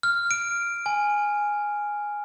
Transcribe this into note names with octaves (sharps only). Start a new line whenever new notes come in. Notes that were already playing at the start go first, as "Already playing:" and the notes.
F6
D7
G#5